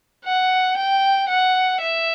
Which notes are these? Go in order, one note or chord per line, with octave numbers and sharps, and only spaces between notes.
F#5
G5
F#5
E5